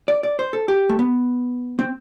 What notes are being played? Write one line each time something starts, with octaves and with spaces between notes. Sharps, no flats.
D5
D5
C5
A4
G4
A3
B3
C4